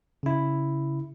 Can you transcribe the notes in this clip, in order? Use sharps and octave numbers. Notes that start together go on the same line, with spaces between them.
C#3 E4